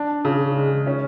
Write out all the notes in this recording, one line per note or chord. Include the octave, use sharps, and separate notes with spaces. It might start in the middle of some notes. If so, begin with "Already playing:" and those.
Already playing: D4
C#3
G#3
C#4